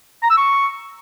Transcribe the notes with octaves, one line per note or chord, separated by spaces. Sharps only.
A#5
E6
C#6